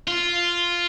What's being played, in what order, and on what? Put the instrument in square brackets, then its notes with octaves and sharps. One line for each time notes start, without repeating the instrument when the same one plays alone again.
[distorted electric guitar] F4